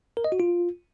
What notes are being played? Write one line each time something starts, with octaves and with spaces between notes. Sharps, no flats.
A#4
D#5
F#4
F4